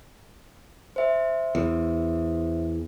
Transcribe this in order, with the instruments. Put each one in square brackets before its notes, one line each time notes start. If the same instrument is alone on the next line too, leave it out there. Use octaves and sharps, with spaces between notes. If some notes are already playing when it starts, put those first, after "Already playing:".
[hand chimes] C5 E5
[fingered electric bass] E2